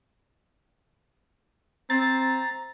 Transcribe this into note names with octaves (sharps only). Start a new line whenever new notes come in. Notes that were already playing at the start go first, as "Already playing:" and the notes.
C4 A#5 A6